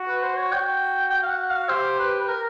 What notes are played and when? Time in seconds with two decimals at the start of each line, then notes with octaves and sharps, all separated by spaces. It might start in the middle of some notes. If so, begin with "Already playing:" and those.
Already playing: F#4
0.08 B4
0.23 C5
0.38 C#5
0.52 F#4 G5
1.11 G5
1.23 F5
1.30 F#5
1.50 F5
1.69 G4 C5
2.00 B4
2.21 B4
2.28 A#4